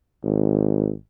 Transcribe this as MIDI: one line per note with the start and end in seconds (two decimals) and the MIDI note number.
0.23 0.92 32